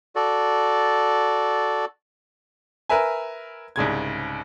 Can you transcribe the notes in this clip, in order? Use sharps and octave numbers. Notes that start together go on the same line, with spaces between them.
F#4 A4 D5
A#4 B4 E5 G#5
C2 G#2 C#3 G#6